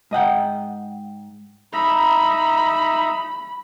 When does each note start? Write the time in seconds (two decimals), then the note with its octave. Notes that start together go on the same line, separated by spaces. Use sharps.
0.11 G#2 D#5 F#5 G5
1.73 D#4 E5 A#5 B5